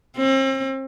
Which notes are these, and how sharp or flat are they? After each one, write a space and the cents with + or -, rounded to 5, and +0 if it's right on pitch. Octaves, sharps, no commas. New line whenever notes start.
C4 +40